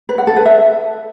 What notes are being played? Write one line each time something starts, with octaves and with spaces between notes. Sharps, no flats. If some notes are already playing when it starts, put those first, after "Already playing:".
B4
F#5
A4
B4
E5